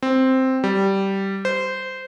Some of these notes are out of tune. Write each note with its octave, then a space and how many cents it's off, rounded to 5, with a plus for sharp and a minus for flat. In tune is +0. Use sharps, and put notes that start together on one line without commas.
C4 +0
G3 -10
C5 -15